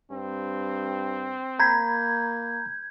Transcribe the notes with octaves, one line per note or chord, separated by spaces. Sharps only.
G2 C4
A#3 A#5 B5 G6 G#6